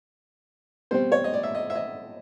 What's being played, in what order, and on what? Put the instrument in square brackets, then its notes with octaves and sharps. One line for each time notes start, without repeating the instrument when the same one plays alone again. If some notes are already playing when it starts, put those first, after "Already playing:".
[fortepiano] B2 G3 C4 C5
C#5
D#5
D5
E5
D#5
E5
D#5